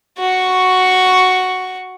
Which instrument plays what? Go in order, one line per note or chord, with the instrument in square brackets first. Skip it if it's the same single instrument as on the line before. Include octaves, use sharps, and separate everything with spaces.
[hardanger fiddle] F#4 C#6